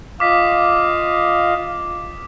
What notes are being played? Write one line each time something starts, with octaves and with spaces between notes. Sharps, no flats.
F4 D#5 F5 D6 B6